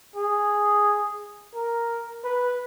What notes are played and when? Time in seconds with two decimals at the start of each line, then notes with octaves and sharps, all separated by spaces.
0.16 G#4
1.55 A#4
2.24 B4